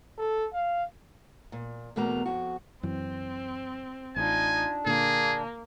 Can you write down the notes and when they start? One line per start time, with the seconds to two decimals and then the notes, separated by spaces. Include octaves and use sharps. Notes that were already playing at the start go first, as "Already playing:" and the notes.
0.18 A4
0.53 F5
1.52 A#2
1.96 E2 B2 A3 A#3 F#4 A#5
2.26 F2 F#4
2.83 F#2 E3 C4
4.16 A1 D4 D#4 F4 G#5
4.86 A#2 D3 A#3 G#4